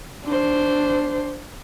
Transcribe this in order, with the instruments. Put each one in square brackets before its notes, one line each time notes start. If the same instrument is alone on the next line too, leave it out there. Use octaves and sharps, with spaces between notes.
[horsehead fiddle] D4 C5